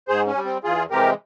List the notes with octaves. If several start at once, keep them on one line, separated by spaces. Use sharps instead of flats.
G#2 G#4 C5
C#4
G3
C4
E2 F4 G#4
C3 E3 G#3 G4 A#4